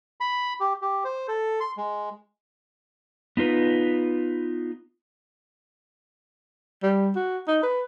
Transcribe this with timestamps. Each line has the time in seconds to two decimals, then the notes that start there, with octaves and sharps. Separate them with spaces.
0.21 B5
0.60 G4
0.82 G4
1.04 C5
1.28 A4
1.60 C6
1.77 G#3
3.37 B3 D#4 F4 B4
6.83 G3
7.16 F#4
7.48 D#4
7.63 B4